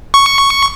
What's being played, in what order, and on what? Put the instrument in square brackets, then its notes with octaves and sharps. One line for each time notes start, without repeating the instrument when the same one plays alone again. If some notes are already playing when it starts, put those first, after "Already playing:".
[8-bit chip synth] C#6